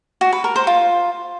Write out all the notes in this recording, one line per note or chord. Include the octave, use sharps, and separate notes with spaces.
F#4
B4
A#4
C5
F4